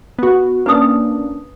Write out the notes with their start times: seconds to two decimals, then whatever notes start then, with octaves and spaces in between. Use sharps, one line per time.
0.19 B3 F#4
0.66 A#3 C#4 D4 B4 D#6